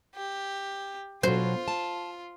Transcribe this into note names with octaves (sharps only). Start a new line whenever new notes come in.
G4
B2 F#3 F4 C5
A5